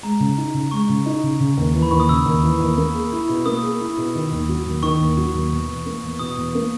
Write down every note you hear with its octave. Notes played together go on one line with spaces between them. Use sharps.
G#3 A#5
C#3
D#4
C#3
G#3 C#6
C#3
D#4
C#3
C#3
D#2
E3
B5
D#2 C#6
D#6
C#3 E6
D#2
E3
D#2
A#3
G#4
E4
B2
A#3 D#6
G#4
E4
B2
D#3
D#2
F#3
D#2
D#3 C#6
D#2
F#3
D#2
B2
E2
A#3
E2
B2 D#6
E2
A#3